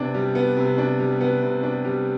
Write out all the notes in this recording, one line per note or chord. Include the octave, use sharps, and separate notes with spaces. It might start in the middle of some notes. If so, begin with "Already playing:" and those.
Already playing: C3 B3 D4
G3
B3
C3
D4
G3
B3
C3
D4
G3